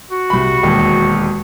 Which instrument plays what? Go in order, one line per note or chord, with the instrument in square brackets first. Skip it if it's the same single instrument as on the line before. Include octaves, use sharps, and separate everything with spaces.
[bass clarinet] F#4
[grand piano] C2 B5
E1 D#2